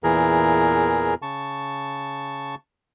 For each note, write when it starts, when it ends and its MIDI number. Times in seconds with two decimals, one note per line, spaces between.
0.04 1.14 40
0.04 1.14 46
0.04 1.14 52
0.04 1.14 68
0.04 1.14 70
1.22 2.55 49
1.22 2.55 81
1.22 2.55 85